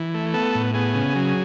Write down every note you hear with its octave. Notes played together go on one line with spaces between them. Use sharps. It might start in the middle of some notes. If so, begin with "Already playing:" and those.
Already playing: E3
A3
B3 A4
A2
B3 G#4
C#3
F#3